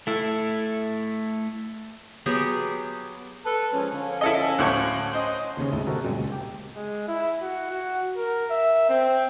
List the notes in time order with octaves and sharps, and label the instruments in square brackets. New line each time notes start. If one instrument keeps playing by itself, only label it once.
[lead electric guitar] A3 E4
[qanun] F#3 B3 G4 G#4
[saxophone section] A4 B4
F3 G#3 C#4
D3 F3 C#4
[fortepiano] E4 A4 D#5
D2 A2 C#6
[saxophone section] C#4 C5 D#5
[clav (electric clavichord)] D#2 C#3 C#4
G#1 D2 G#3 E4 A5
C3 F#4 A4 A#4
F#2 A#2 G3 G#3
C#2
G4
[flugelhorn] G#3
E4
F#4
F#4
A#4
E5
C4